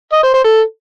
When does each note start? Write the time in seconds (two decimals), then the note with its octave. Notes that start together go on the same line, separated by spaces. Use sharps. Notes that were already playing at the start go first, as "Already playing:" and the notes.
0.13 D#5
0.23 C5
0.34 C5
0.44 A4